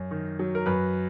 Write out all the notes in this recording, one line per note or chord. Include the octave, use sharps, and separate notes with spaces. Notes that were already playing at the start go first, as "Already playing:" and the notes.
Already playing: F#2
D#3
F#3
A#4
F#2 B4